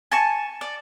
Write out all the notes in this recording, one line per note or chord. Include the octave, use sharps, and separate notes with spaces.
G#5 A5 C#6
D5